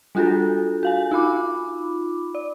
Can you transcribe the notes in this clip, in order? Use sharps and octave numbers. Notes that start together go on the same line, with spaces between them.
G3 D4 F4 F#4 G#4 A4
F#4 F5 G#5
D#4 F4 B5 D6
D5